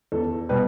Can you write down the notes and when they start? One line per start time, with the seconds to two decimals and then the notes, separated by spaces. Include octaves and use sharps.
0.12 E2 A4
0.49 B2 G3 B4